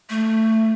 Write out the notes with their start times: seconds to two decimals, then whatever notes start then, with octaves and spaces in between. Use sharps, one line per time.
0.10 A3